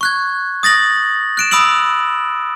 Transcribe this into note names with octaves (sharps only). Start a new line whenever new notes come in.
C#6 F#6 G#6
D#6 A6 A#6 F#7
F#6 D7 E7
B5 D#6 E6 D7 F#7